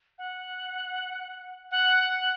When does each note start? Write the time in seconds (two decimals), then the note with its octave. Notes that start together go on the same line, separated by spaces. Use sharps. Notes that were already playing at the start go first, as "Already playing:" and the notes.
0.18 F#5
1.71 F#5